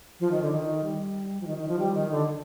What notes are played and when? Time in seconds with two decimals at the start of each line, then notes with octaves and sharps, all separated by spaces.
0.20 F3
0.31 D#3
0.42 D3
0.53 D#3
0.84 G3
1.41 F3
1.47 D#3
1.58 D#3
1.68 F3
1.79 G3
1.95 D#3
2.11 D3